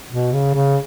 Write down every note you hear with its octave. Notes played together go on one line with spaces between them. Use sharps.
B2
C#3
C#3